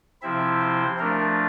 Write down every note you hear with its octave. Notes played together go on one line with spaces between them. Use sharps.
C3 F3 C4 E4 E5
C5
F3 A3 D4 A#4